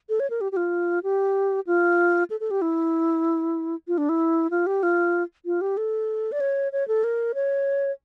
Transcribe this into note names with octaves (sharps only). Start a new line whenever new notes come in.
A4
C#5
A#4
G4
G4
F4
G4
F4
A4
A4
G4
E4
F4
D4
E4
F4
G4
F4
F4
G4
A4
D5
C#5
C#5
A4
A#4
C#5